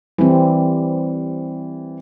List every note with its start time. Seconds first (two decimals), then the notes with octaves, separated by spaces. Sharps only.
0.18 E3 G3 C4